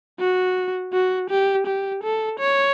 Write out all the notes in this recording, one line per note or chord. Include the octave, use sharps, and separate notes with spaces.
F#4
F#4
G4
G4
A4
C#5